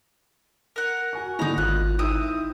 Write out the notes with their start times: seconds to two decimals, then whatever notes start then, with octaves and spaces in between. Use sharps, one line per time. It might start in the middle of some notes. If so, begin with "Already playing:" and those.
0.76 A#4 F#5
1.13 F#4 G#5 C#6
1.39 G#2 D3 D#4 E4 A#5
1.58 G#1 F4 F#6
1.99 C4 D#4 E4 E5 D#6